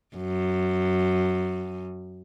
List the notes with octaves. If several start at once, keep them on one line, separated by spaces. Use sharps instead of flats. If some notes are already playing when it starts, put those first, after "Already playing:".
F#2